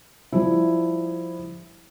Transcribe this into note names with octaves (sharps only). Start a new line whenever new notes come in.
F3 G3 E4